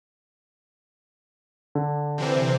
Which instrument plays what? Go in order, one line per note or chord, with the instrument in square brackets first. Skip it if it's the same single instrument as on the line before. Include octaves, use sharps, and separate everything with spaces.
[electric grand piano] D3
[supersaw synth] C3 E3 C4